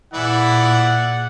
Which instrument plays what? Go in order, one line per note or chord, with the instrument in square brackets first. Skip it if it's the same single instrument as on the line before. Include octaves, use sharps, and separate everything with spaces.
[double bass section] A#2 [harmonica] E3 E4 [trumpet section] G#4 D5 F#5